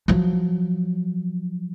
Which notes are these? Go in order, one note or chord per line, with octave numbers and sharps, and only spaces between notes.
F3 F#3